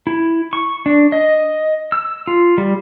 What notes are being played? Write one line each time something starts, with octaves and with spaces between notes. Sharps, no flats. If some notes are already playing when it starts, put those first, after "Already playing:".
E4
C#6
D4
D#5
E6
F4
G3